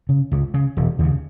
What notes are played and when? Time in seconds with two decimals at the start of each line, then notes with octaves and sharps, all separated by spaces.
0.09 C#3
0.32 C#2
0.54 C#3
0.77 E1
0.99 D#2 C#3